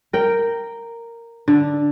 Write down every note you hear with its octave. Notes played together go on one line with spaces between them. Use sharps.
A#4 G5
D3